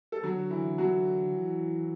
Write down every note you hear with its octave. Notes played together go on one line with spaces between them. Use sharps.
A4
D3 F#3 F#4
E3 E4
D3 F#3 F#4
E3